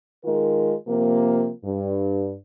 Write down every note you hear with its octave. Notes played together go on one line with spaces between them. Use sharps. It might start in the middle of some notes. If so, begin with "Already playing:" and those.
D#3 G#3 F4 A#4
C3 F3 A#3
G2